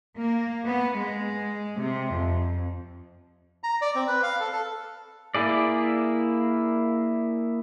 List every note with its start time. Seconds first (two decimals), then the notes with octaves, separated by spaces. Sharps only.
0.17 A#3
0.68 B3
0.98 G#3
1.82 C3
2.14 F2
3.64 A#5
3.81 D5
3.95 C4
4.07 B4
4.23 F5
4.40 A4
4.52 A4
5.35 A#3 E4 G#4 D5